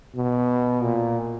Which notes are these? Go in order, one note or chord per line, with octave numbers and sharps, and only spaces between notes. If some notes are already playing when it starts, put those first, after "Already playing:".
B2
A#2